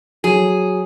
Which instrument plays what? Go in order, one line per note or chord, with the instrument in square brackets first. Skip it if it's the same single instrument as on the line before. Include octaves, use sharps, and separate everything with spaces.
[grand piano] F#3 [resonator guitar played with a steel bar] G#4